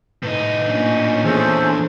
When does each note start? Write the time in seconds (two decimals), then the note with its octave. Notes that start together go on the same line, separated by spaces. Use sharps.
0.23 A2 D#4 B4
0.67 A#2 C#4 D4
1.25 E2 G#4 A4 C5